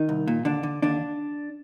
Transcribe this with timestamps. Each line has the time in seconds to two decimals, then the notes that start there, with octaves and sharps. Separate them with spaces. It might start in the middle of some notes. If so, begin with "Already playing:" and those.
Already playing: D#3 D#4
0.09 C2
0.28 A#2
0.45 D#2 D3 D4
0.63 D3
0.82 D#2 D3 D4